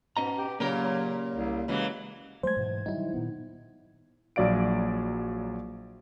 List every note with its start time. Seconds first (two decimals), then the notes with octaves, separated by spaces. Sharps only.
0.17 G#2 B2 C#4 D#5 A#5
0.38 G4
0.60 A#2 C#3 F#3 A#3 G4 A#4
1.35 C2
1.68 C#3 E3 F#3 G#3
2.43 F#3 G#3 A3 C5 G#6
2.57 G#2 B2 E3
2.86 D#3 F#3 G3 D#4 E4
3.14 A#2 D#3 B3
4.36 A#1 F#3 D5 F5 D7